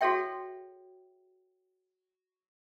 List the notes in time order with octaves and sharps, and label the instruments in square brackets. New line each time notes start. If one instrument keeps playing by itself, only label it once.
[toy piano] F#4 G#4 A4 C#5 E5 G5